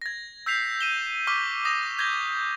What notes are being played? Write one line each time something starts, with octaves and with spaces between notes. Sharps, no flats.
G#6 A#6
E6 G6 B6 C7 F7
D#7 E7 G7
C#6 D6 F6 B6 G7
D#6 A#6 E7 F7
G6 G#6 A#6 G7